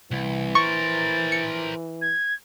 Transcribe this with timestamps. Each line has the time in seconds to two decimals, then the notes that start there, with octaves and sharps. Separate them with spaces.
0.11 C2 E3
0.55 A#4 C5 C#6 A6
1.32 C#7
2.01 G#6